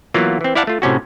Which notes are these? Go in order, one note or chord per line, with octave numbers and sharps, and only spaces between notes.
E3 F#3 A#3 B3 F4
E3 C4
E4 D5 F5 F#5 A5
A3 F4
A2 C3 C#4 F#4